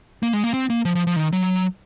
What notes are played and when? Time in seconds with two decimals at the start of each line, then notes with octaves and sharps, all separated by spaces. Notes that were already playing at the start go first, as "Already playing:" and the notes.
0.23 A#3
0.33 G#3
0.44 A#3
0.54 C4
0.70 A#3
0.85 F3
0.95 F3
1.07 F3
1.16 D#3
1.33 F#3